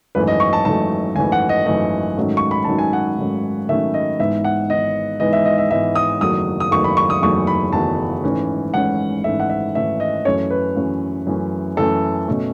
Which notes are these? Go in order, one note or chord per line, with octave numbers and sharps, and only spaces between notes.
G#1 F#2 E3 A3 B4
D#5
C#6
A5
G#1 F#2 E3 A3 A5
G#1 F#2 E3 A3 G#5
F#5
D#5
G#1 F#2 E3 A3 D#5
G#2 D#3 F#3 A3 C#4
C#6
B5
G#2 D#3 F#3 A3 C#4 A5
G#5
F#5
G#2 D#3 F#3 A3 C#4
G#2 D#3 F#3 A3 C#4 E5
D#5
G#1 G#2 E3 B3 E5
F#5
G#1 G#2 E3 B3 D#5
G#1 G#2 E3 B3 D#5
E5
D#5
E5
G#1 G#2 E3 B3 E5
D#6
F#1 E2 D#3 F#3 A3 D#6
D#6
F#1 E2 D#3 F#3 A3 C#6
B5
C#6
D#6
F#1 E2 D#3 F#3 A3 C#6
B5
F#1 E2 D#3 F#3 A3 A5
G#1 G#2 E3 A3 C#4
G#1 G#2 E3 A3 C#4 F#5
G#1 G#2 E3 A3 C#4 E5
F#5
E5
G#1 G#2 E3 A3 C#4 E5
D#5
F#2 E3 A3 C#4 C#5
B4
F#2 E3 A3 C#4
F#2 E3 A3 C#4
F#2 E3 A3 C#4 A4
B2 A3 C#4